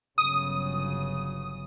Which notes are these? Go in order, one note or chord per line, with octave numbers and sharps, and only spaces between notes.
G1 C#3 F#3 D#6